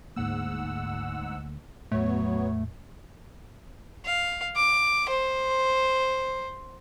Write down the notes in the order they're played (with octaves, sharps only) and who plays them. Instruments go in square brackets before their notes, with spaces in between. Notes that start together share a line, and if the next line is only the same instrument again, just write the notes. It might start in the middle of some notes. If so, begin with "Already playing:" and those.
[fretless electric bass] D2 A#3 [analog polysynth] G#2 F#5 E6
[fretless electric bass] E2 A2 [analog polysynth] F#3 B3 C#5 [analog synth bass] A3
[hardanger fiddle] F5
D6
C5